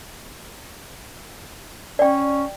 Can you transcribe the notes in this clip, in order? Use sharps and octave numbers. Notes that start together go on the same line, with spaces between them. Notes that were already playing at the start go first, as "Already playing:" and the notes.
C#4 D5 G5